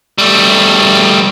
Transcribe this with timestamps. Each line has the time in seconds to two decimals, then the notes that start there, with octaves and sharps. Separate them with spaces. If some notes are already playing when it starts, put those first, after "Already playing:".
0.18 G3 A3